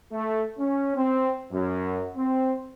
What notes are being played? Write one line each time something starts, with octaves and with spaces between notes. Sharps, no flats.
A3
C#4
C4
F#2
C4